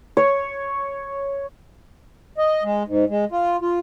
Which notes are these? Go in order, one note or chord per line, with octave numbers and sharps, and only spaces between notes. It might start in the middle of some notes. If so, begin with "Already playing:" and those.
C#5
D#5
G#3
G#2
G#3
F4
F4